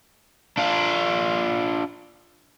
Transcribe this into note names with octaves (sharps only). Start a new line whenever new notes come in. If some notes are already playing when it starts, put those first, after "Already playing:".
D4 F4